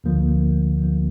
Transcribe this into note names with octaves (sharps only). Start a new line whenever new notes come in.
D2 D3 F3 A#3
D2 D3 F3 A#3